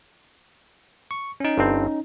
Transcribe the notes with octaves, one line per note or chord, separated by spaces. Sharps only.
C#6
C#4 D#4
G1 G2 C4